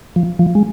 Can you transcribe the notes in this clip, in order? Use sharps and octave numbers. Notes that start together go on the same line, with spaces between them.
F3
F3
G#3